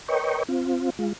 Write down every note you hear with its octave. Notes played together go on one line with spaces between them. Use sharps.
A#4 B4 C#5 D#5 G5 C#6
C4 F4
G#3 F4